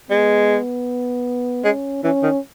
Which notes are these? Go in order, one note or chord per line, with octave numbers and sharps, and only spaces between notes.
G#3 B3
G#3 C#4
E3 C#4
D#3